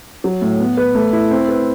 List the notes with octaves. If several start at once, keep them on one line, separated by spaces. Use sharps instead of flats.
F#3
A2
B3
B4
A3
E4
C4
B4